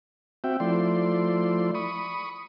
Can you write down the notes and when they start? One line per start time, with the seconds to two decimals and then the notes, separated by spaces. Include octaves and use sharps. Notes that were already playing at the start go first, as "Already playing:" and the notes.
0.44 C4 F#4 E5 G5
0.60 F3 A3 E4 D5 C6
1.75 B5 C#6 D#6